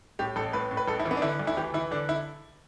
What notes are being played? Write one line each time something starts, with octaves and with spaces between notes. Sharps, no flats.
A2 G4
A1 A4
A2 B4
A2
B4
A1 A4
E4
E3
B3
D4
D3 E4
D2
E4
E3 G4
E3 E4
D3 D4
E4